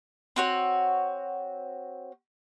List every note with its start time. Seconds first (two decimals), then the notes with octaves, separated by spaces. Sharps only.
0.36 C4 F#4 C#5